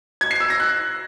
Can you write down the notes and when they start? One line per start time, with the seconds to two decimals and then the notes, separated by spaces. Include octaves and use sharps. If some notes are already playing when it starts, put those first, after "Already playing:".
0.21 G#6
0.31 C7
0.40 E6
0.50 A#6
0.60 F#6